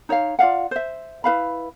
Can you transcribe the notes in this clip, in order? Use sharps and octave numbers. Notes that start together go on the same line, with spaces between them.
D#4 C#5 D5 F5
F4 D5 F5 F#5
C5 E5
E4 B4 F5 B5